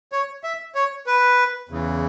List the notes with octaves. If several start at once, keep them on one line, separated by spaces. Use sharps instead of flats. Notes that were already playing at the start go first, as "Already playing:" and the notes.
C#5
E5
C#5
B4
E2 C#3 E3